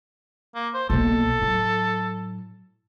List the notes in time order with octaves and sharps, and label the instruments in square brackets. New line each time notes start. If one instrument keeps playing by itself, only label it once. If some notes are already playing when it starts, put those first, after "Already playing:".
[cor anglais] A#3
C5
[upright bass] B1 A#3 [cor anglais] A4
[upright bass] A2 F#3